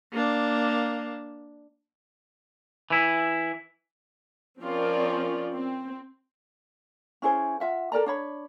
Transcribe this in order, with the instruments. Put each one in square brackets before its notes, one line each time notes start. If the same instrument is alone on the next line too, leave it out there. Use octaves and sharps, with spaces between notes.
[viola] A#3 D4
[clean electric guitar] E3 E4
[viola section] F3 C4 C#4 F4 A#4 D5
C4
[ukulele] C#4 E4 G#4 C5
F4 E5 F#5
A4 A#4 D5 A#5
D4 C#5 B5